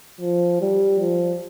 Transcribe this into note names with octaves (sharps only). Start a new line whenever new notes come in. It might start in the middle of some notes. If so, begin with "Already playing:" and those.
F3
G3
F3